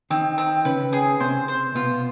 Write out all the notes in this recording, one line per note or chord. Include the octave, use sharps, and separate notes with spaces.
D#3 C4 D#4
C4
C#3 C#4 B4
G#4
C3 C4 C5
C5
B2 B3 F4